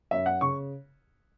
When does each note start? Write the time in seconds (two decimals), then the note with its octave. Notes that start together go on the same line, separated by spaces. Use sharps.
0.11 F#2 E5
0.26 F#5
0.41 C#3 C#6